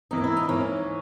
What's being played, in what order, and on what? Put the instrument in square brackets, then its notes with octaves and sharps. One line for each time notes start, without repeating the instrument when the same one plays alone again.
[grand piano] G#2 E3 A#3 [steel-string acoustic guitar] D#4
[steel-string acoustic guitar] E4
D#4
[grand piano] G#2 E3 A#3 [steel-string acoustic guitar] C#4